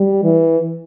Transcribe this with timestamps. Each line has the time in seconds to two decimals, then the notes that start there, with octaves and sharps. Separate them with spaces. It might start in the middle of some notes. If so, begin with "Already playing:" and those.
Already playing: G3
0.24 E3